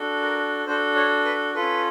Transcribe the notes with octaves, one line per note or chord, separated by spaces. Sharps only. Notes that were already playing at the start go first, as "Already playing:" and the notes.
Already playing: D4 F#4 A4
A#4
D4 F#4 A4 C5
C#5
B4
C#4 F4 A4 B4